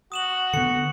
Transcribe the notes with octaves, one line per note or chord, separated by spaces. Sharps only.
F#4 D#6 E7 F#7
D3 B3 C#7